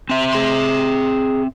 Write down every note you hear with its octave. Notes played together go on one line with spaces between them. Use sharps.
C4 E5
G#4 C6